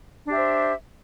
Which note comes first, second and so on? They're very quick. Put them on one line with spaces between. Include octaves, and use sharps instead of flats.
D4 G4 E5 C5